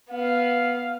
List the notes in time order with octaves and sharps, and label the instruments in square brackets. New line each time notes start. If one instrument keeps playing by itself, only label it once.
[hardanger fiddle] B3 [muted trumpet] F5